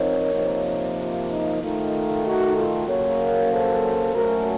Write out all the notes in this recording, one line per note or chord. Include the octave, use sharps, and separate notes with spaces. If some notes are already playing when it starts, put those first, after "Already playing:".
Already playing: F3 C4 D#4 A#4 C#5
C3 F3 A#3 D#4
F4
D#4
D#3 A3 D#4 F4
D#4 F#4
F4 A4
C#3 F#3 A#3 A#4 C#5
A4 C5
A#2 F#3 A3 C#4 F#4 A#4